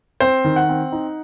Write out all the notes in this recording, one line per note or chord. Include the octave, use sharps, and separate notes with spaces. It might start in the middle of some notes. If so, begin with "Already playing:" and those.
C4 C5
D#3
F#5
C4
D#4